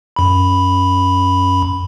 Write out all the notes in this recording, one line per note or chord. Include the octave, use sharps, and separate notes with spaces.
F#2 B5